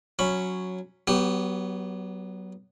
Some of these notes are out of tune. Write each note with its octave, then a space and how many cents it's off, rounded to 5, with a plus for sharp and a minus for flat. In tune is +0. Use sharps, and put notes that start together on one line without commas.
F#3 -5 C#4 +0 B5 +0
F#3 +25 B3 +0 G4 +0